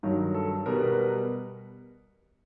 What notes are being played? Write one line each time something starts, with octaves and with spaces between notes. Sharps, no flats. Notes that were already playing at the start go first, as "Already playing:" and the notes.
G2 D#3 F#3
A4
B2 G3 A#4
B4
A#4
B4
A#4